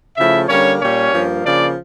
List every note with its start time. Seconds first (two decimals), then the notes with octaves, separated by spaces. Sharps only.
0.16 C#3 F3 A3 E4 E5
0.48 D3 G3 A#3 C#4 C#5
0.79 A#2 G3 A#3 C#4 C#5
1.11 G2 F3 A#3
1.43 C#3 F3 A#3 D4 D5